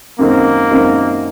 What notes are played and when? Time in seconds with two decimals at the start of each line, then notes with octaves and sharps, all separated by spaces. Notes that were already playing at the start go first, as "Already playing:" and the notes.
0.19 F#2 D#3 G#3 A#3 C4
0.69 F#2 D#3 G#3 C4